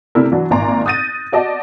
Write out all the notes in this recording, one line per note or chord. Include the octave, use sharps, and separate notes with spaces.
C3 A3 D4 E4 A#4
E3 F#3 D4
G#1 A#2 D5 G#5 A#5 C6
D#6 F#6 G6 A6 A#6 D#7
F#4 D5 D#5 A5